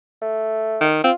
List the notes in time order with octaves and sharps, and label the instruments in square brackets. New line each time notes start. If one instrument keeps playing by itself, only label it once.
[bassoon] A3
[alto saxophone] D#3
[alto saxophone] C4 [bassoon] F4